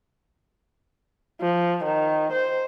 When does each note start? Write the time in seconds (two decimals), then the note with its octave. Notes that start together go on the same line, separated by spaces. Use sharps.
1.41 F3
1.84 D#3
2.32 C5